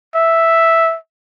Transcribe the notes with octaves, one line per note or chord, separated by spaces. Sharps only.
E5